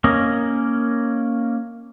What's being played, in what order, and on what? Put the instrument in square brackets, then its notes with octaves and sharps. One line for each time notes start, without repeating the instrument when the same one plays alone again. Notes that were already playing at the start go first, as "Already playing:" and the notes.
[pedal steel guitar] A#3 C#4 D#5